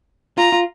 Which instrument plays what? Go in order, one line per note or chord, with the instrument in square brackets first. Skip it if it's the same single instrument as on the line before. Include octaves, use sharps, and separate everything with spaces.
[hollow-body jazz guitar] F4 [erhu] A#5
[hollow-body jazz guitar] F4